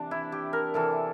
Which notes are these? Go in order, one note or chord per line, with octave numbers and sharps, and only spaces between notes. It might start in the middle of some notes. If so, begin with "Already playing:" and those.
Already playing: C3 E3 D4
E4
G4
A#4
C3 E3 A4